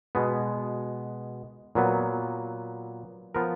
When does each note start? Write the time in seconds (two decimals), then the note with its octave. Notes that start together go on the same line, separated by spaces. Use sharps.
0.15 B2 G#3 B3
1.75 A#2 F#3 B3
3.35 F3 B3 F4 A#4